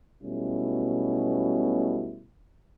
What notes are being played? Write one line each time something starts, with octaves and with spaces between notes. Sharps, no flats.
B1 B2 G3 A3 C#4 E4